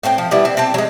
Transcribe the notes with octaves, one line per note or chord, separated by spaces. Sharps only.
A2 C4 F4 G5
F3
G3 B3 E4
C4
C4 G5 A5
F#3 G#3